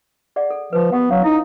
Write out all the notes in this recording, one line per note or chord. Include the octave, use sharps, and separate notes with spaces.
G#4 D5 F#5
A4
F3 B4
B3 G4 A#4 F#5
F#3 C#4 F5
D#4 E4